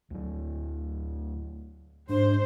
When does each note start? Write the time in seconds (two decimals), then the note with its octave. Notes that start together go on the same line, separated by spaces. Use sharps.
0.10 D2 F#3
2.09 G#2 D4 C5